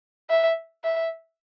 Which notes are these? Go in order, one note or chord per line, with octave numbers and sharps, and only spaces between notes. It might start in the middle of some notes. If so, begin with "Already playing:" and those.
E5
E5